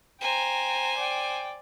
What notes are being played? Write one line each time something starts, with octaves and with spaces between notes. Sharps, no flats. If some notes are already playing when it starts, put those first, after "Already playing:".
C5 G5 G#5 A#5
D5 G5